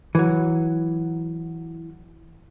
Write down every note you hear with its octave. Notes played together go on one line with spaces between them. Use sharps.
E3 F#3